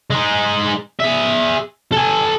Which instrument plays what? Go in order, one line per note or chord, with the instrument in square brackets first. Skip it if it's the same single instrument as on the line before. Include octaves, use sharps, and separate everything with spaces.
[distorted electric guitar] G#3 D#4
G#4 E5
A4 G#5